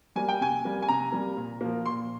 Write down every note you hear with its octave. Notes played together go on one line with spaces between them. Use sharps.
G3 A#3 G#5
G5
C3 G#5
G3 A#3
G#5
C3 A#5
G3 A#3
A#2
F3 A#3
A#2 C6